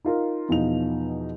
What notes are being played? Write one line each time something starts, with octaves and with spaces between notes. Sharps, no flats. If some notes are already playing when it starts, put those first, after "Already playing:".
D#4 F4 A#4
E2 B2 F3 D#4 F7